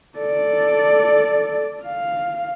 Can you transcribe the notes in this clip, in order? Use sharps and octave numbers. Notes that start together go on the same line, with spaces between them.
A4 D5
F5